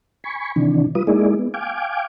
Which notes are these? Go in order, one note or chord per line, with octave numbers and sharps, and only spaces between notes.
G#5 B5 C#6
C3 D#3 E3 D4
G3 F4 B4 D#6
G#3 A#3 D#4 E4 G#4 D5
B3
F5 G5 G#5 D6